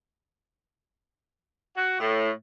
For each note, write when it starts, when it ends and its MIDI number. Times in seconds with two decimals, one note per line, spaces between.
1.75 1.98 66
1.99 2.30 45